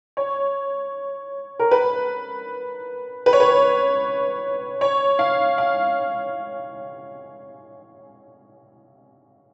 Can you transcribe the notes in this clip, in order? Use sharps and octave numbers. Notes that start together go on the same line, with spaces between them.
C#5
A#4
B4
B4
C#5
B4
C#5
F5
F5